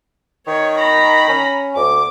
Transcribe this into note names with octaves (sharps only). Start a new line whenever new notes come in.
D#3 C#5
A#5 B5
C#4
D2 D6